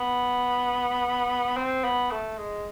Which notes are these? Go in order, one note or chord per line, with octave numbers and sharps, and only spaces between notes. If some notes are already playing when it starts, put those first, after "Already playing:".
Already playing: B3
C4
B3
A3
G#3